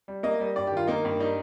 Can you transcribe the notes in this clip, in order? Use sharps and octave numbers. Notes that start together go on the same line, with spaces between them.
G3
A#3 D#5
G3
G2 D5
D#3 G4
F4
A#3 D#4
G2
G3 D#4